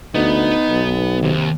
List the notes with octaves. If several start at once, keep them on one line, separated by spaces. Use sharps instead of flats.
D2 B3 D#4
B1
D#2 C3